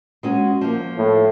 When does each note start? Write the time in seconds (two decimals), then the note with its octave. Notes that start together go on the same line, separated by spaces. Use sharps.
0.23 G#3 C#4 F#4
0.61 F3 A#3
0.98 A2